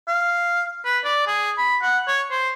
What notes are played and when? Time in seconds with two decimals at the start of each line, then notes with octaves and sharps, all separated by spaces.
0.08 F5
0.85 B4
1.04 D5
1.27 G#4
1.58 B5
1.82 F#5
2.07 C#5
2.31 C5